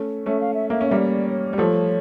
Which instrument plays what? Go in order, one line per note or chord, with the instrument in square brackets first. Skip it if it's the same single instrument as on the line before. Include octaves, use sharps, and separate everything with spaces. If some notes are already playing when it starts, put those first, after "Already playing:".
Already playing: [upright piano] A3 C#4
[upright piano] A3 C#4 [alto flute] E5
[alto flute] F5
E5
[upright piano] A#3 [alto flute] E5
[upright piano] C#4
[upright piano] G3 A#3 [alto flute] E5
[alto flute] D5
C#5
[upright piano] G3
[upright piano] F3 A3 [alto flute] C#5